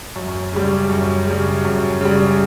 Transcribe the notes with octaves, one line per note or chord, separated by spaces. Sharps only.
F#2
C#3 G3
F#2
C#3 G3
F#2
C#3 G3